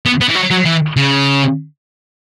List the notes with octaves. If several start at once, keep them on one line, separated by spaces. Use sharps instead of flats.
B3
B3
E3
F#3
F#3
E3
C#3